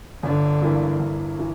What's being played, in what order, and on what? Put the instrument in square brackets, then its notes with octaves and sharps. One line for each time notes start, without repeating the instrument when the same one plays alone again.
[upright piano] G1 [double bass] D3
[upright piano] G2 E3 A#3 E4
G1
E3